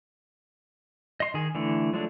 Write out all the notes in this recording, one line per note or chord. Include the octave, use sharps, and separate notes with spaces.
D#5 C6
D#3 G#4
D3 E3 A3
F3 F#3 G#3 A3 D4